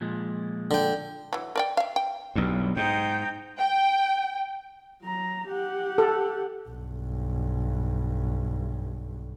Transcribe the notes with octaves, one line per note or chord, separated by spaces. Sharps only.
A#2 F3 G#3
D3 G5
E3 F#3
A#4 D5 G5
E5 F5
G5
B1 G2
G#2 D#4 G5
G5
F#3 A#5
G4 F#5
A4
B1 G2